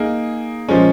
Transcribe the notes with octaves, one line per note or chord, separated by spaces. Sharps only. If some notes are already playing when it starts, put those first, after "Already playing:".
Already playing: A#3 D#4 G#4
A#2 F3 G#3 C#4